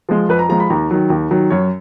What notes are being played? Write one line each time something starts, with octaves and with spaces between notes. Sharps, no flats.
F3 G#3
F2 B4
A#5
F3 G#3 A#5
B5
D#2 A#5
D#3 F#3
D#2
D#3 F#3
F#2 C#5